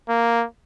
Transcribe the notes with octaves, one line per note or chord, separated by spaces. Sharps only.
A#3